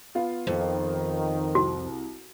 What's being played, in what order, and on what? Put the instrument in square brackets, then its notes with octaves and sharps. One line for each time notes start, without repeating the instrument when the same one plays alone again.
[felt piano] B3 F4 F5
[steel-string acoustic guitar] F2 [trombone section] D#3
[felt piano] C2 [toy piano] F#4